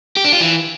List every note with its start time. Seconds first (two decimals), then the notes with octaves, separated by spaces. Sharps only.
0.17 G4
0.24 D4
0.32 F4
0.40 E3